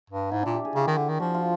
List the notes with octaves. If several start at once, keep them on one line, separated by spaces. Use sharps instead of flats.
G2
G#2 E4
A#2 D4
G4
G#4
C#3 G4
D#3
D3
D#3
F3 F#4
F4